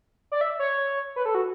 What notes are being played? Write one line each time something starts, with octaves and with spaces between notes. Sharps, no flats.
D5
E5
C#5
B4
A4
F#4